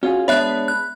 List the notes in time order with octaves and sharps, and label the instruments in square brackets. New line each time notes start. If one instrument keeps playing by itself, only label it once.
[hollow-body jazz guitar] C#4 F4 G#4 [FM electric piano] F#4
[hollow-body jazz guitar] G#3 B3 D4 [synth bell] C#5 E5 F#6 [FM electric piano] B5
[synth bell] F#6